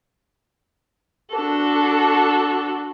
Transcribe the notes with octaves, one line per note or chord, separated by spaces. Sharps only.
D4 F#4 A4